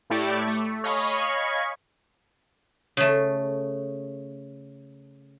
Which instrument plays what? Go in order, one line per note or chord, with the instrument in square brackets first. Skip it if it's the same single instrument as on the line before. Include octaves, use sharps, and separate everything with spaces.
[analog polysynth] A2 A3 E4 G4 D5 C#6
A3
C#5 D#5 F5 G#5 B5 C#6
[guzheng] C#3 A3